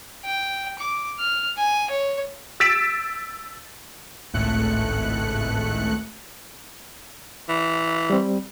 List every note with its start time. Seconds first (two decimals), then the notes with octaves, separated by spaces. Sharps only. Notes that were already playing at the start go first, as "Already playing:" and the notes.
0.25 G5
0.78 D6
1.19 F6
1.57 G#5
1.90 C#5
2.60 E6 A6 B6 D7 E7
4.33 G#1 C#2 A2 A3 F#6 C#7
7.49 E3
8.10 G3 C4